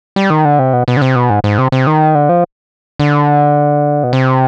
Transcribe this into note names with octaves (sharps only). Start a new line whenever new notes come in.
G3
D#3
D3
C3
B2
B2
D3
C3
B2
G#2
G#2
C3
C3
D#3
D3
F3
D3
B2
C3